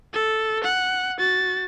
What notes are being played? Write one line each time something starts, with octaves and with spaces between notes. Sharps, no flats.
A4
F#5
F#4 A6